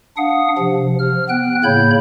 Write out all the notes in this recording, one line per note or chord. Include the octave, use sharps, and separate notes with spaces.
D4 F5 F#5 D#6
C3 F3
F6
B3 G5 F#6
A2 C#3 A#3 C#5 B5 G6